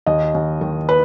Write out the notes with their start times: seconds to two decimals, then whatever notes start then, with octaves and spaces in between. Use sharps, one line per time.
0.07 D#2 D#5
0.35 D#2
0.61 D#3
0.89 B4